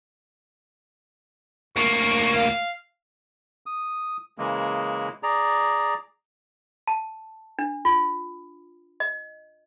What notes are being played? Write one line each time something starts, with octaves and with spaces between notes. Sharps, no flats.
D2 A#3 C#6
F5
D#6
C#3 E3 G#3 A#3
G#4 D5 A#5
A5
D4
F4
D#5